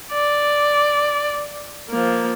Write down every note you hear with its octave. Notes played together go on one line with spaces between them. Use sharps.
D5
F3 A#3